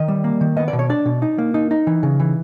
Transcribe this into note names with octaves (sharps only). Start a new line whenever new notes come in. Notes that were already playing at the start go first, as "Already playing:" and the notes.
Already playing: D#3 D#5
G3
A#3
D#3
B3 D#5
D5
B2
C#5
D4 D5
B2
D#4
A#3
D#4
D#4
E3
C#3
E3